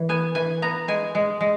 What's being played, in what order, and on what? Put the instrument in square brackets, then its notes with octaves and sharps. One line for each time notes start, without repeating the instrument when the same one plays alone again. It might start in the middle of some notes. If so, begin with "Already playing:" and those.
Already playing: [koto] E3
B3 G#5
E3 G#5
B3 A#5
G#3 G#5
G#3
G#3